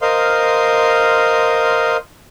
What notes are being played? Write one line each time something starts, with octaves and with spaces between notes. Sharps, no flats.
A#4 C5 D#5 F5 C6